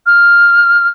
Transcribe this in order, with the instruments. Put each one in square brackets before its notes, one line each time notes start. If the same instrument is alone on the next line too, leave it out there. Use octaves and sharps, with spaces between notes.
[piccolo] F6